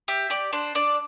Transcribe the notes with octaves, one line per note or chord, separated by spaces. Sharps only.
G4 E5
G4 D5
D4 C5
D4 D5